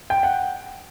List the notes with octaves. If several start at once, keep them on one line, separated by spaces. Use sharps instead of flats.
G5
F#5